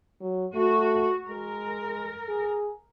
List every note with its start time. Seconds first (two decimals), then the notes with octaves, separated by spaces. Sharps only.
0.21 F#3
0.54 A3 F#4
1.27 G#3 A#4
2.29 G#4